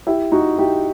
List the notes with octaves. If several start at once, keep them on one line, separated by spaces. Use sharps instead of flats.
E4 G4
D#4 F#4
E4 G4